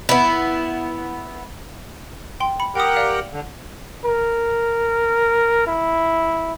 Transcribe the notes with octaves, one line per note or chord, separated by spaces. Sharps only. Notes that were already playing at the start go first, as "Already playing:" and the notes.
B3 E4
G5 C6
B5 C#7
G4 A#4 F#5 G5 D#6
D5 F5
D3
A#4
E4